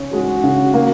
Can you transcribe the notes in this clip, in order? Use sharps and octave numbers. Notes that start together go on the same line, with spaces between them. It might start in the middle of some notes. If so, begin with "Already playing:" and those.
Already playing: C#3 C#4
G#3 F#4
C#3
A#3